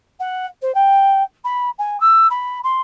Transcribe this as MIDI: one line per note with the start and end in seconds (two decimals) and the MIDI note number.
0.19 0.46 78
0.62 0.74 72
0.74 1.23 79
1.44 1.69 83
1.78 1.99 80
2.00 2.27 88
2.30 2.59 83
2.63 2.81 84